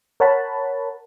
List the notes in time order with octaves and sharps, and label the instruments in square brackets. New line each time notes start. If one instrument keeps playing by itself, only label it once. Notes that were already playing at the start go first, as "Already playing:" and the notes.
[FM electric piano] A#4 C#5 F#5 A5 B5